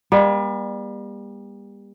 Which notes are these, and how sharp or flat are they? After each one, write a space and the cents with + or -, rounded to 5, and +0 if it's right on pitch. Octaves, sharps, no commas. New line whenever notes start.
G3 +35 B3 -45